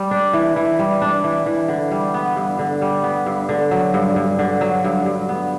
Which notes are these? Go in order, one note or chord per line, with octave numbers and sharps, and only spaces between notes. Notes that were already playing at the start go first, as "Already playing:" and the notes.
Already playing: G3
D4
E3
E3
G3
D4
E3
E3
D3
G3
B3
G2
D3
G3
B3
G2
D3
F#3
G2
G2
D3
F#3
G2
G2
B3